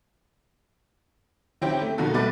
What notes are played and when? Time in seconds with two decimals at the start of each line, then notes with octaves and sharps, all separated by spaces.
1.61 D#3 C4 C#4 E4 G4
1.82 A3
1.98 B2 D#3 A#3 D#4 F#4 A4
2.14 B2 G3 A3 B4 D6 A6